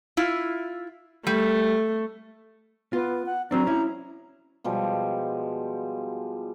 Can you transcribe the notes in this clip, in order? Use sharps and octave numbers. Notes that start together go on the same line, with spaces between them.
E4 F4
G3 A3
B3 F4
F#5
F#3 C4 D4 A#5
C#4 E4
B2 F3 G3 G#3